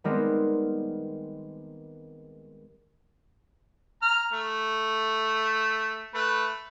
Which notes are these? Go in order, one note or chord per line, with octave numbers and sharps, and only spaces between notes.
D#3 G3 G#3 B3 C4 A#4
A#5 F6
A3
A3 B4